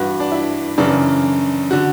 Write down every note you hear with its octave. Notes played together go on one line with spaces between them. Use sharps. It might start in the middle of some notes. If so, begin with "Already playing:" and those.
Already playing: G2 E3 F#4
D4
E4
F#2 C#3 E3 D4
D3 F#4